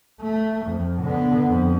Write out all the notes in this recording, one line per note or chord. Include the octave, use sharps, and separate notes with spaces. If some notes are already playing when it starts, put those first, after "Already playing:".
A3
F2
D3 B3
F2